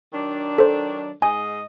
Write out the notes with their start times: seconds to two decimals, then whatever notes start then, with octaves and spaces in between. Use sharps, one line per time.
0.13 D#3 F#3 D4
0.58 A4 C5
1.22 G#2 D#5 G#5